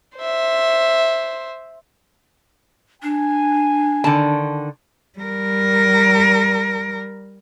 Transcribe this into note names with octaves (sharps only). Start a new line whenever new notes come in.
C5 E5
D4 G#5
D3 D#3 A5
G3 A#4